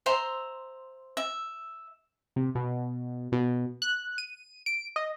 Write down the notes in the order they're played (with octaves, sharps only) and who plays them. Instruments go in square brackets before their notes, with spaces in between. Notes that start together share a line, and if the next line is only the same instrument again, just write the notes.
[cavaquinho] C5 E5 A#5 C6
E5
[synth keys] C3
B2
B2
F#6
D#7
D7
D#5